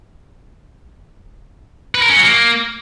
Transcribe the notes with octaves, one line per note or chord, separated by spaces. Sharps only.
B4
A#4
C#4
F#3
A#3